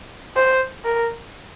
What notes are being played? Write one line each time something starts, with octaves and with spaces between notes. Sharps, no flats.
C5
A#4